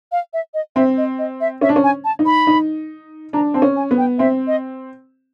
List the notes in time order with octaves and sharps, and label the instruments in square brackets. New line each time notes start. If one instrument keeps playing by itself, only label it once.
[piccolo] F5
E5
D#5
[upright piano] C4 [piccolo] E5
[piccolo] D#5
D#5
E5
[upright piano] C#4 [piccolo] E5
[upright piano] D4
C#4
[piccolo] G#5
A5
[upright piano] D#4
[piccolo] B5
[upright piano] D#4
[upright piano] D4 [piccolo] A#5
[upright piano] C4 [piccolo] A5
[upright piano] C#4
[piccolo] G#5
[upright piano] B3
[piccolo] G5
[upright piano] C4 [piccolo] E5
[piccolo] D#5